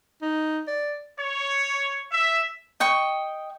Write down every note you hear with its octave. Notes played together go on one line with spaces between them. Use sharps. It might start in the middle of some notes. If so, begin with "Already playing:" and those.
D#4
D5
C#5
E5
D#5 G5 C#6